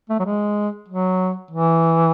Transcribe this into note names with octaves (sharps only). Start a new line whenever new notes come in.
A3
F#3
G#3
F#3
E3